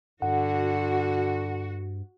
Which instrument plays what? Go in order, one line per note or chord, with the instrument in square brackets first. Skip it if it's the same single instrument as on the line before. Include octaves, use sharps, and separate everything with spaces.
[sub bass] G2 [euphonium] D3 [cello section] F#4 [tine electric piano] F#5